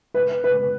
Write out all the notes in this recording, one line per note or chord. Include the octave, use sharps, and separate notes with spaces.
B4
B4